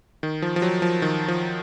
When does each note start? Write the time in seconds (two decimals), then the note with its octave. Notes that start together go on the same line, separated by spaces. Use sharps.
0.23 D#3
0.42 F3
0.56 F3
0.62 F#3
0.82 F3
1.02 D#3
1.28 F3